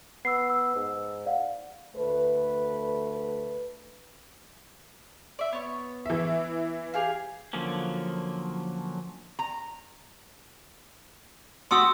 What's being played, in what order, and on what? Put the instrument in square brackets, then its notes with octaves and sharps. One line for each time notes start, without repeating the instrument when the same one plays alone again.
[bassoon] B3 [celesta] E6 C7
[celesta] E6
[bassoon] G#2
[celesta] D5 F5 F#5
[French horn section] D2 A3 B4
[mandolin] D5 E5
B3 C#5
[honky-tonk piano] E3 E5
[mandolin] G4 G#4 F5
[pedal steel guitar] D3 F3 F#3 A#3 C#4
[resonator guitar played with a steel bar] A#5
[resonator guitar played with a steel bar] A3 F#4 G4 [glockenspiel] C6 D#6 E6